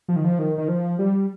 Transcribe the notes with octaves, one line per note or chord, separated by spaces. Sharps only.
F3
D#3
F3
D#3
D#3
F3
G3